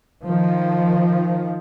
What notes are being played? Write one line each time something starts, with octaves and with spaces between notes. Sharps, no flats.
D#3 F3